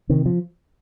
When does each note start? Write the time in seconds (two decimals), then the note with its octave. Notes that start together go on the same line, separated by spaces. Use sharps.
0.09 C3 D#3
0.26 F3